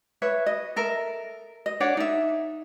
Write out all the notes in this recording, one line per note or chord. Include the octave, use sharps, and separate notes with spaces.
B4 C#5 E5
D#5
A4 A#4 E5
D#5
D4 C#5 D5 F#5
D#4 E5